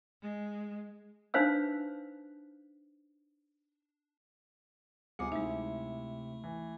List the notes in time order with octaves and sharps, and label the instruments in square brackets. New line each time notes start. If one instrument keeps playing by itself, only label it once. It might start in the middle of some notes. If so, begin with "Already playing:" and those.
[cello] G#3
[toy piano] D4 D#4 B4 C5 F5 E6
[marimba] D2 D6 [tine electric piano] C3 C#7 [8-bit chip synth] G3 B3 F4 [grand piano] G#4
[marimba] G#3 D#4 [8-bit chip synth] A3 [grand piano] E4
[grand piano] E3